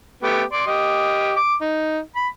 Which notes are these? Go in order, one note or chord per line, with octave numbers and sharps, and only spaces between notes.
A3 B3 G4
D5 C6
G4 D#5
D6
D#4
B5